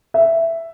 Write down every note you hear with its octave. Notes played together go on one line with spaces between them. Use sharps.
E5